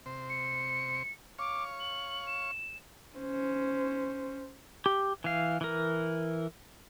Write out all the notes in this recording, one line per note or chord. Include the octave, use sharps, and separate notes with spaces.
C3 C5
C#7
C#5 F5 C#6 D6
F#7
E7
C#4 C5
G4
E3 F5
E3 A#4